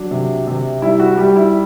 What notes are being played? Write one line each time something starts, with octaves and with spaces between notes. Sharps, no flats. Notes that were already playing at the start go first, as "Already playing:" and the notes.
Already playing: F#3 D4
C3
C3
G3 E4
F#4
G3 G4
E4